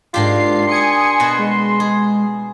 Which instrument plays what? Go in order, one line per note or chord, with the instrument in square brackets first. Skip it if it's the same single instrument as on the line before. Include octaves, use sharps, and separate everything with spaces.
[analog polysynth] G#2 C7 [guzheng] A#3 D4 G4 [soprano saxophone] F4
[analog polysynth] G#5 D#6 C#7 [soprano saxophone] C6
[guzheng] B2 F#4
[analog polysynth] G#3
[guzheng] G#4